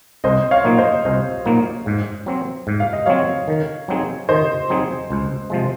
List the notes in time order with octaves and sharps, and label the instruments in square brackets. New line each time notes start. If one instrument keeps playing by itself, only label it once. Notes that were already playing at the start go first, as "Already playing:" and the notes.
[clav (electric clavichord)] C2 [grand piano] C5 D#5
[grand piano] C#5 F5
[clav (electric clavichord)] A#2 F#3 A#3 D#4
[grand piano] C5 D#5
[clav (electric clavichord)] C2 [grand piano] C5 D#5
[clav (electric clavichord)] A#2 F#3 A#3 D#4
G#2
F#3 C4
G#2
[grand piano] F5
D#5
[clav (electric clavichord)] F#3 C4 [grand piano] C#5 F5
[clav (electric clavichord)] D#3
F#3 C4 D#4 G#4
[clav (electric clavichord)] D#3 [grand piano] C5 D#5
[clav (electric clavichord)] F#3 C4 D#4 G#4
C#2
C3 F3 G#3